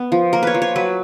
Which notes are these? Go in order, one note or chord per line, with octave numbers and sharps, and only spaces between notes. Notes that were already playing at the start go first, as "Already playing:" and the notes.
Already playing: B3
F3
A#3 A#4
B4 C#5
F3
C#5
F#3 B4